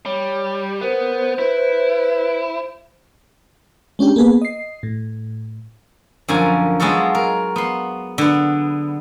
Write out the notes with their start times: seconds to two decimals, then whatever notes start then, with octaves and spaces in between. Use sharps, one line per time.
0.06 G3 C#5
0.81 B3 A#4 C5
1.39 E4 B4
3.99 G#3 C#4 D4 G4
4.16 A#3 B3 G#4 B4
4.42 D#5 C7
4.83 A2
6.28 F#2 D3 F3 A#4 G#5
6.80 F#3 G#3 B3 F4 F#4 A4
7.15 A#4
7.56 B3 C6
8.18 D3 B3